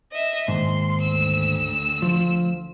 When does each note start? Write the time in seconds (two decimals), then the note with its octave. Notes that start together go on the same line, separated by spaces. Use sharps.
0.13 D#5 E5
0.48 D#2 G#2 C6
1.01 D2 E6
2.02 F3